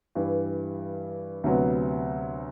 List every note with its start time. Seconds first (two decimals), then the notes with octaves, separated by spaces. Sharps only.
0.15 G2 E3 G3
1.44 D2 C3 F#3 B3